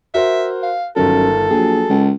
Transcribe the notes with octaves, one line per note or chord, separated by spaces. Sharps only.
F#4 A#4 C5 E5
F5
G1 F#2 D#3 A4 A#4
A#1 F#3 G#4
C#2